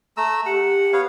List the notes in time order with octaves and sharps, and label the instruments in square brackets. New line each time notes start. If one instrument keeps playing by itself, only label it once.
[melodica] A3 A#5 E6
[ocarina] G4 [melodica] F#5
[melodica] B3 C#5 F5